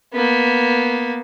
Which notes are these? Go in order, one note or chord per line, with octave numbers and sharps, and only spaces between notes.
A#3 B3